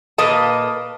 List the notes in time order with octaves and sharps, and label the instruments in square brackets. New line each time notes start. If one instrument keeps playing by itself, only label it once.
[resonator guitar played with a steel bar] A#2 A#3 B4 D#5 A5